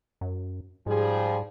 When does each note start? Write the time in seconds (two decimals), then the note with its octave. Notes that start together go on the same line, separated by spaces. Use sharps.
0.21 F#2
0.86 G#2 F3 G3 G#4